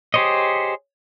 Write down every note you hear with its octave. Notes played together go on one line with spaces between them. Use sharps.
G4 G#4 C5 C#5 D#5